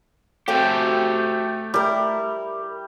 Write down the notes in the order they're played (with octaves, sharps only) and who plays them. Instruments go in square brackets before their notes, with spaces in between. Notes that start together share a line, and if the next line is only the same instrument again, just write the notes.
[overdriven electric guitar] A3 G4 [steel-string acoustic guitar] C4 F#4 A4 [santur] G5
[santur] G3 [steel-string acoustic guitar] E4 A#4